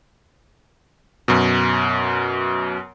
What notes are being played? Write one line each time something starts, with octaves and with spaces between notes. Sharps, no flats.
F#2 B2